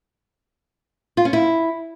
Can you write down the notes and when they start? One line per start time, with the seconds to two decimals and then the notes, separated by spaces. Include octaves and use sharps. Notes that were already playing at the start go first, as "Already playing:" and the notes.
1.17 F4
1.25 C#4
1.33 E4